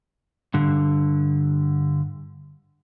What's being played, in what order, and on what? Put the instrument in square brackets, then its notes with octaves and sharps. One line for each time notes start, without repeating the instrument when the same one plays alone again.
[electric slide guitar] G2 D3